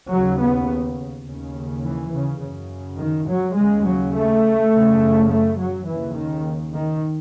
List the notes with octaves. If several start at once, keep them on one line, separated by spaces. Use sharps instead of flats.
D#2 C#3 F#3
B3
D#2 C#3
E3
C#3
F#2 C#3
D#3
F#3
D#2 C#3 G#3
F#3
A3
F#2 C#3
A3
F#3
D#2 C#3 E3
D#3
D#3